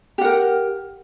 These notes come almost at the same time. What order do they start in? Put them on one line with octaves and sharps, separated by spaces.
G4 F#5 A#4